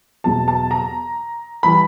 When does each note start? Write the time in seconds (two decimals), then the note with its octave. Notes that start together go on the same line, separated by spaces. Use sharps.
0.24 E2 B2 F#3 A5
0.48 A5
0.71 A#5
1.63 E3 G3 B5